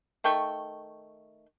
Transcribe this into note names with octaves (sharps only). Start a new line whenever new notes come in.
D#3 A3 G5 C#6